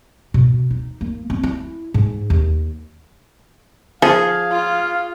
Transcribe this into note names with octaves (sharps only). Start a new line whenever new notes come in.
B2
D#4
A#3
C4
E4
G#2
D#2
F3 G#4 F5
F4